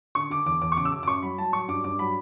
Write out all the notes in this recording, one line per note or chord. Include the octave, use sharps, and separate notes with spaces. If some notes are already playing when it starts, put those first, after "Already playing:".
D3 C#6
D3 D6
E2 D6
E2 D6
C#6
C#3 D6
E6
F#2 D6
D6
F#2 C#6
F#3 B5
F#3 A5
F#3 C#6
G2 D6
G2 D6
F#3 B5